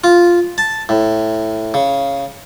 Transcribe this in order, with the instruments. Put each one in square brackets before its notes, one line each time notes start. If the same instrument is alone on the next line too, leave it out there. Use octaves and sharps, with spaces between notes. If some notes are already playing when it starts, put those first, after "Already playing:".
[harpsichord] F4
A5
A2
C#3